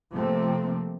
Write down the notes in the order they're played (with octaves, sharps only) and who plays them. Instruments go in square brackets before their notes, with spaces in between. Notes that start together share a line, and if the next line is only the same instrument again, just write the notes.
[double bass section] C3 F3 A3 A#3 C4